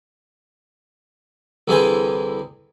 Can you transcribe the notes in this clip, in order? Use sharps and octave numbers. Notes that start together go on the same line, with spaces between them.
C2 D3 E3 G#4 C5 G#5